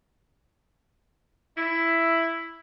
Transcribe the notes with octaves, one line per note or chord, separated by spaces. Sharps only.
E4